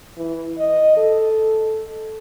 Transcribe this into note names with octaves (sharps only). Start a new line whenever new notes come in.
E3
D#5
A4